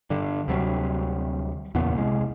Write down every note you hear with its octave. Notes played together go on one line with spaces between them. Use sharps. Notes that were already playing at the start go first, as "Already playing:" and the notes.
G2 D3
D2 C3 F#3 G3
E2 A#2 C#3 B3
C2 G#3